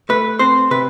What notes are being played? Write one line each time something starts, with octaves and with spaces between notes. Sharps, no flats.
A3 B4
C4 C5
C3 B4